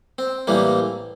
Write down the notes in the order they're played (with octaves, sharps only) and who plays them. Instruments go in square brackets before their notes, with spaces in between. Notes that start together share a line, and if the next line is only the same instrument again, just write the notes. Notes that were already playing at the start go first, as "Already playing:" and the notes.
[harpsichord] C4
A2 E3 G3 A#3